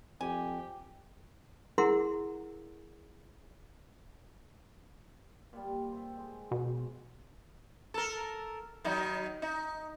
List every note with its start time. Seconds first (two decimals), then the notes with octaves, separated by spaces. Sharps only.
0.21 F2 G4 G#5
1.78 E4 G#4 A#4 F#5 A#5 C6
5.53 A#2 G3
5.92 C5 E5
6.17 G#3
6.51 B2
7.94 A4 A#4
8.84 D#3 F#3 D#4
9.42 D#4